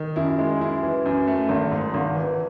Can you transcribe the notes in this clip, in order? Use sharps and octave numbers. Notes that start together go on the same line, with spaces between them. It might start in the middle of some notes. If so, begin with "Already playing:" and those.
Already playing: D#3
F#2 E4
G#3
F#2 E4
E3
F#2
A3
G#1
G#2
G#1
E3